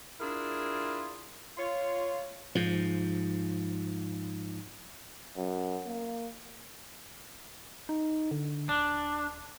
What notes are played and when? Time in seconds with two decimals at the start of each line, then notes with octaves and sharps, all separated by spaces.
0.20 D4 E4 F4 G#4 A#4
1.57 F4 C#5
2.55 G#2 F3
5.37 F#2
5.86 A#3
7.89 D#4
8.31 D3
8.69 D#1 D4